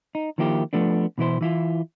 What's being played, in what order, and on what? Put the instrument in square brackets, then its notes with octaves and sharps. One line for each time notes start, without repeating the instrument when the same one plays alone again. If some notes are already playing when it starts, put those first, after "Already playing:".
[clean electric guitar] D#4
D#3 F3 A#3 E4 G4
F3 A3 B3 D4
B2 E3 E4 C5
E3 E4 F4